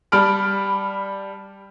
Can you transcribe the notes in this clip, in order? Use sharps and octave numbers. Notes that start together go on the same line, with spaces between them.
G3 A5 B5 F6 D7